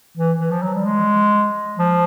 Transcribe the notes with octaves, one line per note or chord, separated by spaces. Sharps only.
E3
E3
F3
F#3
G3
G#3
F3